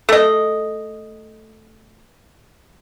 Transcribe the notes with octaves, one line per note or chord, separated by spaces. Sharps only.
A3 D#5